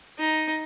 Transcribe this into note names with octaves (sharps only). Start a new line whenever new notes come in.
D#4